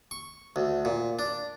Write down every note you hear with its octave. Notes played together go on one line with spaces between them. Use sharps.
C#6
D2
A#2
D4